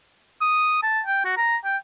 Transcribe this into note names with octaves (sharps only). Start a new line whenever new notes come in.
D#6
A5
G5
F#4
A#5
G5